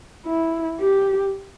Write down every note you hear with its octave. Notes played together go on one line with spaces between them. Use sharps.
E4
G4